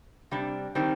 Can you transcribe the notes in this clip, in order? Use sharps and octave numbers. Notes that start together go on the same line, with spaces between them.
C3 G3 D4
D#3 G3 C4 D#4